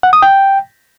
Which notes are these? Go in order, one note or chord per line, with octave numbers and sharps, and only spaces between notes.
F#5
D#6
G5